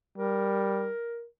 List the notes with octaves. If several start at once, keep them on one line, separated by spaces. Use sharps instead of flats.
G3 A#4